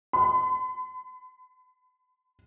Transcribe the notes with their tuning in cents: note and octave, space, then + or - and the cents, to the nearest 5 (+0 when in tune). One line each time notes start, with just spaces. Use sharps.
B5 +40